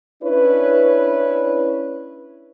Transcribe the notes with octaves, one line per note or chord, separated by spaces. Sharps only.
C#4 D4 E4 B4 C#5